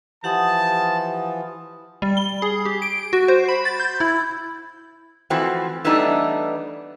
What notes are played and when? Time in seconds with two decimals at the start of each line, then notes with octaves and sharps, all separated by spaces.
0.24 E3 F3 G4 F#5 A5 D#6
2.02 G3
2.17 G7
2.42 G#4
2.65 G4
2.82 D7
3.13 F#4
3.28 C5
3.49 B5
3.65 A6
3.79 G6
4.00 E4
5.30 E3 F3 A3 C4 F#4
5.85 E3 G3 A3 B3 D4 D#4